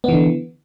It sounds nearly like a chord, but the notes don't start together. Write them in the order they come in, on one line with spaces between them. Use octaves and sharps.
B3 E3 D3